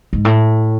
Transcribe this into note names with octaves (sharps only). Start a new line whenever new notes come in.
G#2
A2